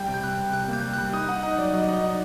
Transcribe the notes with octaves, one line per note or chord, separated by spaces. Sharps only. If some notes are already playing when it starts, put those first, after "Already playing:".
Already playing: G3 G5
C3
G6
G3 F#6
C3
C3 F#6
A#3
G6
G3
G3 F#6
D#4 D#6
D#4 F#5
D#4 D#5
F#3 D5
F#3 D#5
D#4 D#5
D#4